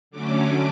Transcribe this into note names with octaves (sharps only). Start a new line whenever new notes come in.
D3 F#3 A3 C#4 D6